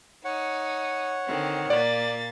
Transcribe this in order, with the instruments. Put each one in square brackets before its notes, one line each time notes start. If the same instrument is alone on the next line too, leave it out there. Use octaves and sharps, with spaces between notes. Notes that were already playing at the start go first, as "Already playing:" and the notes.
[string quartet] D#4 D#6 [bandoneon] C#5 F#5
[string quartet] D3 D#3 C4
[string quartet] A#2 A#3 A6 [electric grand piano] D5